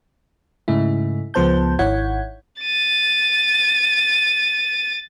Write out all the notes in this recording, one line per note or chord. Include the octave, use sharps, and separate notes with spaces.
G#2 C#3 A3 E4
C#2 F3 B3 C5 A5 G6
G#1 E4 C#5 F#5 G6 G#6
A6 D#7